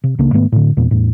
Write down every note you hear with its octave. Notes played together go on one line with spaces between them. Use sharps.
C3
C#2 C#3 A#3 D4
G#2 D#3 A3 B3
A2 D3
E2 A#2
E2 A2